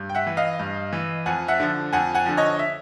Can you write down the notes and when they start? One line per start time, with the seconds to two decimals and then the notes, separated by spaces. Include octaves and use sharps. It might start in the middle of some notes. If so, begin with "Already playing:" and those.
Already playing: G2
0.09 G5
0.15 E5 F#5
0.27 E3
0.37 D#5 F5
0.59 G2
0.93 E3
1.26 F2 F#5 G#5
1.48 E5 F#5
1.60 D3 F3
1.93 F2 F#5 G#5
2.15 F#5 G#5
2.26 D3 F3
2.37 C#5 D#5
2.59 E5